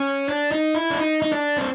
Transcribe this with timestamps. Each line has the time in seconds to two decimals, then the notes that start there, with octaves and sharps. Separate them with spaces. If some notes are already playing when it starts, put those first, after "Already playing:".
Already playing: C#4
0.29 D4
0.52 D#4
0.75 E4
0.91 D4
0.98 D#4
1.22 D#4
1.33 D4
1.58 C4